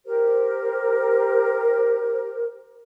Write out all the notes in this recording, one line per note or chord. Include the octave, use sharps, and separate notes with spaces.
G4 A#4 C5